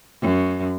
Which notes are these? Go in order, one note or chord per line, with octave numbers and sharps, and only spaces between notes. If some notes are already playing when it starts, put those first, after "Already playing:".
F#2